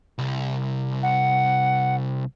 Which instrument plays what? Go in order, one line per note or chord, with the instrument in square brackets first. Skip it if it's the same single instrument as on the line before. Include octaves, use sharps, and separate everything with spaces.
[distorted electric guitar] C2
[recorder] F#5